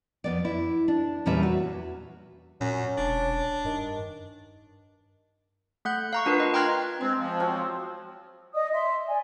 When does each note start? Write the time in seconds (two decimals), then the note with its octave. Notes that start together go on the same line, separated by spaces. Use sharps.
0.24 F2 B3 D5
0.45 E4
0.88 D4
1.26 E2 A#2 G3 C#4 B4 E5
1.43 F#4
2.61 F#2 A#2 C#4
2.98 E1 D4
3.64 G2 D#3
5.85 A3 F#5 F#6 G6
6.13 F5 A#5 C#6
6.26 D4 F4 A#4 B4
6.40 D#5
6.54 G5 A#5 C6 F6 F#6 G#6
7.01 G#3 C4
7.18 F3
7.40 F#3 C4 F4
8.54 D5 D#5 D#6
8.73 E5 C6
9.08 D5 G#5